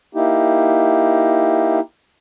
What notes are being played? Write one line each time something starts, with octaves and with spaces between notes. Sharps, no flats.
A#3 D#4 E4 G4